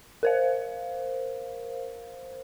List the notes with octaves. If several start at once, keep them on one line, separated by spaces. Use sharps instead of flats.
A#4 C5 F5